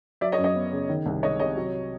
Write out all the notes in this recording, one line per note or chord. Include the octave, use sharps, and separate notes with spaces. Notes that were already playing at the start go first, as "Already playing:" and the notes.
F#3 D5 E5
C#5 D#5
F#2
C#5 D#5
B3
C#3
D#3
C2
G#3 C#5 D#5
C3 C#5 D#5
F#3